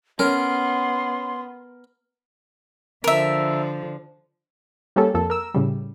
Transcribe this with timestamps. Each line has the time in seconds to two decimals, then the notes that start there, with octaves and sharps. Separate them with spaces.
0.19 B3 C#4 A#4 C6
3.04 D3 F3 A#4 E5
4.96 G3 A#3 C#4 G4 A4
5.14 F2 A#3 A4
5.30 A#4 E6
5.54 A2 C#3 G3